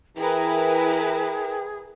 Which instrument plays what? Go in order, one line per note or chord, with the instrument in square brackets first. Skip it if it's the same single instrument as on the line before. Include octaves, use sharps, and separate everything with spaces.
[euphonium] E3 [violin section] E4 A#4 B4 [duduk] G#4 [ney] G5